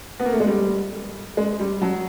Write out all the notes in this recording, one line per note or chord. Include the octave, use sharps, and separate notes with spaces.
B3
A#3
A3
G#3
G3
G#3
G3
F#3